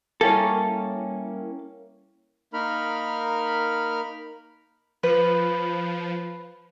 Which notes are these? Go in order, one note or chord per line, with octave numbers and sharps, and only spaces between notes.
G3 A#3 C#4 E4 A4 E5
A#3 D#4 A#4 B5 F6
F3 B4